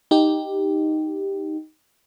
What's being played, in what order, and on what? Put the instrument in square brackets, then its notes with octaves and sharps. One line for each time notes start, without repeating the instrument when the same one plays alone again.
[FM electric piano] D#4 G4